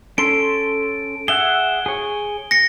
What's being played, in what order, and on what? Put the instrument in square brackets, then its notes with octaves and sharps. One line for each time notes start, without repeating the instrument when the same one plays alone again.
[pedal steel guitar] C#4 A4 C6 [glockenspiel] D7
[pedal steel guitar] G#4 E5 F#5 [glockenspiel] G7
[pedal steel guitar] G#4 C#5
[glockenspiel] A#6 C#7